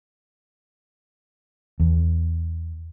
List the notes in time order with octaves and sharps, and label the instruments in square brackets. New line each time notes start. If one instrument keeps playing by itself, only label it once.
[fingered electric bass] E2